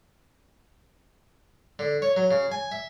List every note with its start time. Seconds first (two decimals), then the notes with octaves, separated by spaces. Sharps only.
1.79 D3
2.02 C#5
2.16 F#3
2.31 C#3
2.52 G#5
2.72 E5